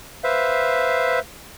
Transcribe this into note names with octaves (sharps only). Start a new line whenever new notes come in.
B4 C5 E5 F5